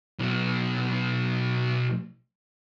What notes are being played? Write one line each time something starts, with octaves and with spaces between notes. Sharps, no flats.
B1 B2